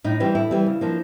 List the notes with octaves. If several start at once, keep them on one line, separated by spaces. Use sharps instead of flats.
A2 D#4
E3 G3 C4
A2 E4
E3 G3 C4
C#3
F3 A#3 D4